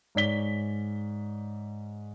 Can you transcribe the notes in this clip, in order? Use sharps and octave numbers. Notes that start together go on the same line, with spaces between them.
G#2 C#5 D5 B6 G7